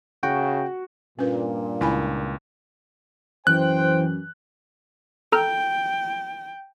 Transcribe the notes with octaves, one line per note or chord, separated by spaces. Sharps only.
C#3 F#4 G5
G2 A#2 C#4 B4
C#2 E4 G#5 B5
F#2 E3 C5 G5 F#6
A4 G5 A#5 F6